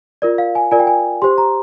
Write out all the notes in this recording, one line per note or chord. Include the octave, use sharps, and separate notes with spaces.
F4 A#4 D5
F5
G#5
F4 A#4 D5 G#5
G5
G#5
G4 C5 C6
A#5